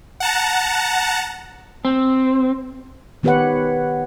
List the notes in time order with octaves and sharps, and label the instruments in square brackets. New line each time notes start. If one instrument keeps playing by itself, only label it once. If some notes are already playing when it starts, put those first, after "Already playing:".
[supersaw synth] F#5 A5 A#5
[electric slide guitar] C4
[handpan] D#3 B3 G4 B4 C#5 F#5